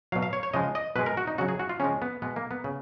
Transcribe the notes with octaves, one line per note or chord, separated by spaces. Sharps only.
B2 F#3 F5
F5
C#5
C#5
C#3 F3 G#3 D#5
D#5
B2 G#3 B4
A#4
F#4
D#4
C#3 F#3 F#4
G#4
F#4
F4
C#3 F3 G#3 C#4
B3
B2 G#3 B3
A#3
B3
C#3